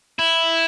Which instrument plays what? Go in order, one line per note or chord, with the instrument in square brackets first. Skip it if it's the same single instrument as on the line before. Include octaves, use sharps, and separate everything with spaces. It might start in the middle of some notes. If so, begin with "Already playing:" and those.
[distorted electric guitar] E4